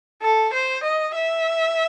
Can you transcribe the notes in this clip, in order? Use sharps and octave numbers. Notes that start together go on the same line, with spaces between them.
A4
C5
D#5
E5